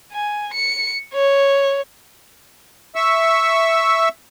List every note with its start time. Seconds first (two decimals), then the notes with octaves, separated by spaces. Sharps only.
0.12 G#5
0.53 C#7
1.14 C#5
2.96 E5 C#6 E6